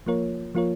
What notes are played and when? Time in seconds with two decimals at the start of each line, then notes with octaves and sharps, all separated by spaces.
0.06 F3 A#3 F4 A#4 C#5
0.55 F3 A#3 F4 A#4 C#5